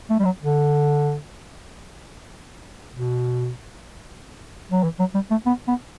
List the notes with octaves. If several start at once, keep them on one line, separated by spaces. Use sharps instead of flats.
A3
G3
F#3
D3
B2
F#3
E3
F#3
G3
A3
B3
B3